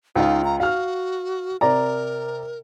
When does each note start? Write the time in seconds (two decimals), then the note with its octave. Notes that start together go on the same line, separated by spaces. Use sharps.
0.16 C#2 D#4 F4 F5
0.44 A#5
0.60 F#4 F5 F6
1.61 C3 A#4 D5 A#5